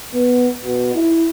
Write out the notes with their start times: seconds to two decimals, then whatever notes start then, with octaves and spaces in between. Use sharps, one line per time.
0.13 B3
0.65 B2
0.95 E4